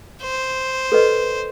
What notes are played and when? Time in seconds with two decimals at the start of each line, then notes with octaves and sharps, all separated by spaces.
0.22 C5
0.92 A4 B4 D#5